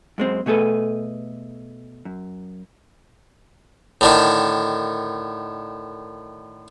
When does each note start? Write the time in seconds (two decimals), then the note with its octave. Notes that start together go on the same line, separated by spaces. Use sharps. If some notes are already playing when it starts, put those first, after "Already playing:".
0.18 F#2 G#3 C4
0.46 B2 A3 G#4 A4 B4
2.05 F#2
4.01 A2 D3 D#3